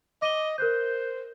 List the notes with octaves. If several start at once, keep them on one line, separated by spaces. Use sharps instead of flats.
D#5 D6 D#7 G7
A#4 C5 F#6 G6